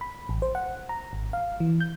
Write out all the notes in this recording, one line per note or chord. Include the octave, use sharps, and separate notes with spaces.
B5
A1
C5
F#5
A#5
G#1
F5
E3
G6